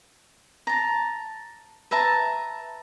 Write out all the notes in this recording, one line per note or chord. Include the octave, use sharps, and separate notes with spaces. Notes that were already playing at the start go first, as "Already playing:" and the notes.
A5 A#5
B4 E5 A5 A#5